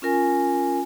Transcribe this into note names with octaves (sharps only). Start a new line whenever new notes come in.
C#4 F4 A#4 G#5